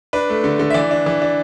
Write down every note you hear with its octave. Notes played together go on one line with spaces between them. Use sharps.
D4 B4
A3
D3
D3
E5
E3 D5
D4
E3
D4